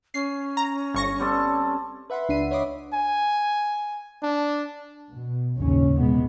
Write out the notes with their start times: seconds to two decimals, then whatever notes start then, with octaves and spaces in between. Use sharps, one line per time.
0.14 C#4 C7
0.57 A#5
0.94 G1 C#6 A#6
1.19 G3 C4 A4
2.10 B4 E5 F#5 B5 C6
2.29 C#2 D4 E5 C7 D#7
2.51 C#5 D#5 E5 B5 D6 D#6
2.94 G#5
4.23 D4
5.11 B2
5.58 A#1 D#2 G#2 C#3 C#4
5.97 A#1 C3 G#3 B3